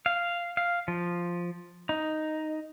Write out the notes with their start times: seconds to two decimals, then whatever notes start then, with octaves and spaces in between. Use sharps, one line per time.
0.06 F5
0.57 F5
0.88 F3
1.89 D#4